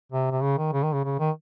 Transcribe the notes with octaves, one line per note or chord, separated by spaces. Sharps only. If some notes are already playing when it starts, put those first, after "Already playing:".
C3
C3
C#3
D#3
C#3
D#3
C#3
C#3
D#3